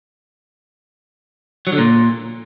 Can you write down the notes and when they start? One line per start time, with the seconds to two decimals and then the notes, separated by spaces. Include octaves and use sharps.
1.67 F#3
1.72 D3
1.78 A#2